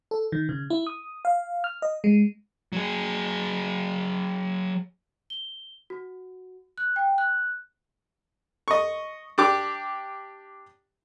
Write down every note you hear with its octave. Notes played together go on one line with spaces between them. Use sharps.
A4
D#3
C#3
E4
D#6
F5
F6
D#5
G#3
F#3 G#4
G7
F#4
F#6
G5
F#6
D#5 C#6
D4 G4 D6